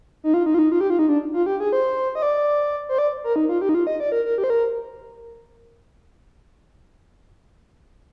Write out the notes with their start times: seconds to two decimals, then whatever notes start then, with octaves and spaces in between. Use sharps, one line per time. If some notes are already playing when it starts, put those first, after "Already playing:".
0.24 D#4
0.34 F4
0.46 D#4
0.54 F4
0.59 D#4
0.72 F4
0.81 G4
0.90 F4
0.99 D#4
1.09 D4
1.34 F4
1.46 G4
1.60 G#4
1.73 C5
2.15 D#5
2.22 D5
2.89 C5
2.98 D5
3.24 A#4
3.36 D#4
3.49 F4
3.61 G4
3.69 D#4
3.74 F4
3.87 D#5
4.00 D5
4.12 A#4
4.25 A#4
4.38 G4
4.44 C5
4.50 A#4